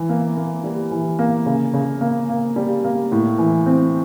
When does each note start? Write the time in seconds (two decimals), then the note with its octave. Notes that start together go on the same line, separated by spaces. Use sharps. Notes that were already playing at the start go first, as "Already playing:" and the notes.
Already playing: E3
0.09 A#3
0.37 A#3
0.64 G3
0.91 E3
1.19 A#3
1.46 C#3
1.74 C#3
2.01 A#3
2.29 A#3
2.56 G3
2.84 A#3
3.12 A2
3.38 E3
3.66 C4